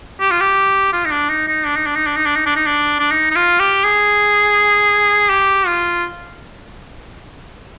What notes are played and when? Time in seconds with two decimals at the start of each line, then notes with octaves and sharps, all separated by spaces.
0.20 G4
0.31 F4
0.40 G4
0.93 F4
1.05 D#4
1.11 D4
1.29 D#4
1.48 D#4
1.65 D4
1.76 D#4
1.86 D4
1.95 D#4
2.06 D4
2.16 D#4
2.26 D4
2.36 D#4
2.46 D4
2.56 D#4
2.66 D4
2.99 D4
3.11 D#4
3.31 D#4
3.36 F4
3.60 G4
3.84 G#4
5.29 G4
5.66 F4